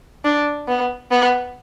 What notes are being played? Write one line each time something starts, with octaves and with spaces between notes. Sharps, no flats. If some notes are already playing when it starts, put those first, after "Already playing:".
D4
B3
B3